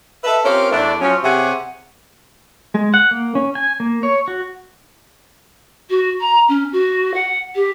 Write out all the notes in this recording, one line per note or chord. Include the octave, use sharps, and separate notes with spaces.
A4 B4 D#5 E5
C4 C#4 F4 G4 A#4
E2 A3 B3 D4
F3 F#3 C#4
C3 G4 G#4 C#5 E5 F#5
G#3
F#5
A#3
C#4
G#5
A#3
C#5
F#4
F#4
A#5
C#4
F#4
F#5
G4